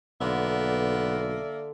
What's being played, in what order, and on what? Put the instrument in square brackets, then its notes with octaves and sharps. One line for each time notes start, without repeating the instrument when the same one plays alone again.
[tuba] B1 [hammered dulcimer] D3 [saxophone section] A#3 D5 E5 [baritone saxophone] B3